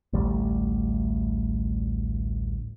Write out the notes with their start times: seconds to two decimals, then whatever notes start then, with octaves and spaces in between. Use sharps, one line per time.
0.13 A1 D2 G3